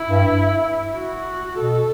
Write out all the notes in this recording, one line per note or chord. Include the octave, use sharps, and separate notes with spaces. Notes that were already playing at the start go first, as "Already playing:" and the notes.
Already playing: E4
G2
F#4
B2 A4